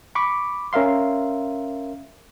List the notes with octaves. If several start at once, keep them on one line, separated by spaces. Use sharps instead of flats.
B5 C#6 D6
C#4 A#4 E5 F5 C6